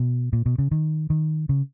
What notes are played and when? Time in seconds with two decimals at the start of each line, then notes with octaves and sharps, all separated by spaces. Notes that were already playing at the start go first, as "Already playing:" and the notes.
Already playing: B2
0.33 A#2
0.46 B2
0.58 C#3
0.71 D#3
1.10 D#3
1.49 C#3